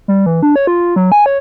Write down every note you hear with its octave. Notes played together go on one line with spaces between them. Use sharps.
G3
E3
D4
C#5
F4
F#3
G#5
C#5